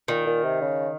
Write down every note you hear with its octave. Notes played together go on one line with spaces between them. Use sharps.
A#2 D#3
A#2
C3
C#3